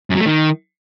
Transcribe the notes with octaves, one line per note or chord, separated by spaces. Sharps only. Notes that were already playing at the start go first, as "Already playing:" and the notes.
F#2
F#3
A3
D#3